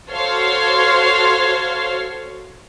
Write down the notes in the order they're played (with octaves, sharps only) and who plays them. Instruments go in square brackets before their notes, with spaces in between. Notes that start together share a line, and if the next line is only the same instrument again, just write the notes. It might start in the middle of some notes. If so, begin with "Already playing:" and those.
[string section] F#4 A4 C5 C#5 F5 C6